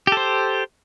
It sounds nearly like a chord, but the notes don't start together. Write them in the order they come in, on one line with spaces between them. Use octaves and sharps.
G4 A4 C5